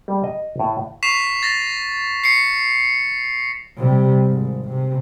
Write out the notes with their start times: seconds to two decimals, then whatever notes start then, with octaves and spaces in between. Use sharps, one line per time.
0.08 G3
0.24 D#5
0.59 A2
1.03 C#6 B6 C7 E7 F7
1.43 A6 A#6
2.24 C7 C#7
3.77 C3 G3
4.24 G#1 G#2
4.68 C3